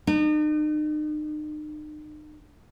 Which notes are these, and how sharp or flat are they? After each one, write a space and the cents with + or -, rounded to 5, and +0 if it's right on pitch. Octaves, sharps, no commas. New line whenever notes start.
D#4 -40